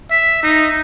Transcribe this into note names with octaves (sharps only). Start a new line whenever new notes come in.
E5
D#4